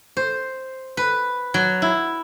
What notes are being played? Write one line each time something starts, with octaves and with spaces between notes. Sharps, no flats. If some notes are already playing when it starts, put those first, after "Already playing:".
C5
B4
F#3
E4